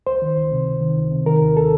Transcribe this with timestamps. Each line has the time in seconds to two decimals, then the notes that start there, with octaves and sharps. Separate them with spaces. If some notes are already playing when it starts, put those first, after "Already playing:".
0.07 C#2 C5
0.22 D#3
0.37 C#2
0.52 C3
0.67 C#2
0.81 D#3
0.97 C#2
1.12 C3
1.26 D#3 A#4
1.41 D#2
1.57 A4